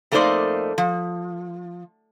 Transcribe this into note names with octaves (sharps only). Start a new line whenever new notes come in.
F2 A3 A#3 D#4 C5 D5
F3